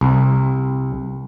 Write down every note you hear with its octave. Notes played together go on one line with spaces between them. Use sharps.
C2